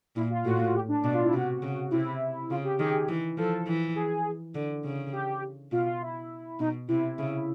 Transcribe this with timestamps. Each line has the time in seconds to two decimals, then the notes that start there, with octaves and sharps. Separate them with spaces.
0.16 A#2 E4
0.30 F4
0.45 A2 F#4
0.75 G4
0.89 D4
1.04 B2 D4
1.14 F4
1.24 E4
1.33 C3 F#4
1.62 C#3
1.91 C3 E4
2.50 C#3 F4
2.64 G4
2.79 D#3 G#4
3.09 E3
3.38 F3 A4
3.67 E3
3.96 G#4
4.55 D3
4.84 C#3
5.13 G4
5.72 B2 F4
5.86 F4
6.02 E4
6.59 B2 D#4
6.89 C3 E4
7.19 C#3